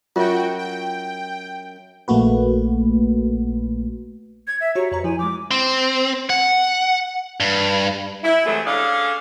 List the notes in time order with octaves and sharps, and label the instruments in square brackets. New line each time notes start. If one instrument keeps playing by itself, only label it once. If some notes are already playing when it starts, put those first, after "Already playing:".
[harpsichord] F#2 [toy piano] F4 [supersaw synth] F#4 G5
[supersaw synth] G5
[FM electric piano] A#1 A3 A#3 F#4 B4
[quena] G#6
E5
[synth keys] F#4 G4 A#5 [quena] C#5
[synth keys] F2 B4 A#5 [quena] C#5
[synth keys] F3 E4 [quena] G#5
[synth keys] F3 G#3 [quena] D6
[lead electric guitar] C4
F#5
G2
[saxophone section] E4
C3 E3 F#3 G#3 A3
C#4 D4 G#4 A4 F5